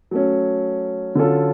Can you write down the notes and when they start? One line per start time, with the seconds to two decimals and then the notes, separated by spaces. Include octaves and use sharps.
0.11 F#3 A3 C#4
1.15 D3 F#3 C#4 F4 A4